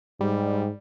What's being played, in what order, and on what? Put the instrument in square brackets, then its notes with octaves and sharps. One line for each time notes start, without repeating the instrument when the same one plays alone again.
[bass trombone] G#2 [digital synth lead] G3